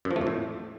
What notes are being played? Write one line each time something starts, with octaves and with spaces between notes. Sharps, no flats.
F#2
F3
A3
F2
A2